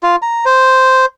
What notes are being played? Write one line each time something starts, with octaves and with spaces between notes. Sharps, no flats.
F4
A#5
C5